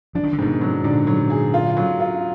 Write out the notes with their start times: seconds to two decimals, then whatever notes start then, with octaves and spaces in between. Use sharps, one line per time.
0.15 F3 D4
0.23 D#3
0.33 D3
0.38 G#2 B2 D#3
0.61 F#3
0.84 A#2 D3 D4
1.07 F#3
1.30 G#4
1.54 F4
1.77 F#3
2.00 F4